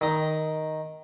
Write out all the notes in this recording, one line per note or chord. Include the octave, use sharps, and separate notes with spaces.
D#3 D#4